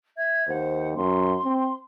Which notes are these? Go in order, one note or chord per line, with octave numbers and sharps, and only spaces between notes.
E5 G#6
D#2 C5 F#5
F#2 C6
C4